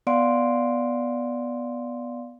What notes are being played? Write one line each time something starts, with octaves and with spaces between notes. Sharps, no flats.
B3 D5 F5 F#5 C6 D7